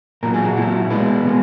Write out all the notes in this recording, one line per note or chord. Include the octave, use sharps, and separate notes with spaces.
A#2 F#3 A#4
G#4
F#4
A#2 F#3 E4
B2 G#3 B4
B2 G#3